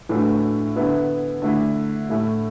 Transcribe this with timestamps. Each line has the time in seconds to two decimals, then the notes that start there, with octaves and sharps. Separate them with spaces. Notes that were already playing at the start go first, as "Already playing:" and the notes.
0.09 A2 E3 A3 D4 F#4
0.76 D3 B3 E4
1.42 D3 A3 E4
2.09 A2 A3 E4